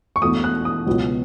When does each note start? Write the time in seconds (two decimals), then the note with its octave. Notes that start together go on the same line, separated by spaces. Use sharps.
0.16 C#6
0.22 E1 E2 B2 A3 D#6
0.44 F#6
0.65 D#6
0.87 C#2 B2 F#3 B3